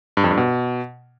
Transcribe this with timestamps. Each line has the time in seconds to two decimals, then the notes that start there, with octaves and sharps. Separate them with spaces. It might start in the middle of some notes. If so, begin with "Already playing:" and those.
0.17 G2
0.24 F2
0.31 G2
0.37 B2